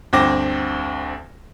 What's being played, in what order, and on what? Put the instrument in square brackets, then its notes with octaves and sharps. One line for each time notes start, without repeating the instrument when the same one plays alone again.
[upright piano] D2 G2 C4 D6 A#6